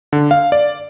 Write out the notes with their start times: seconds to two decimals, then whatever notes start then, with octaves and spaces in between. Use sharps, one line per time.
0.13 D3
0.31 F5
0.52 D5